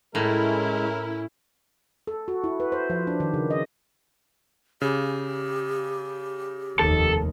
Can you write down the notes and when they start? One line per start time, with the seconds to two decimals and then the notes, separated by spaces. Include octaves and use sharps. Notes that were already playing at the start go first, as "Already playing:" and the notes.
0.15 A2 G#3 C#4 E4 A#4
2.07 A4
2.28 F#4
2.44 E4
2.60 B4
2.72 C5
2.90 F3
3.07 D4
3.20 D#3
3.34 C#3
3.50 D#5
4.82 C#3 G4
6.79 F1 D#2 D#3 A4